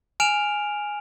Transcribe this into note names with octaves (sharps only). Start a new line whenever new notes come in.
G#5 F6 D7 E7 F7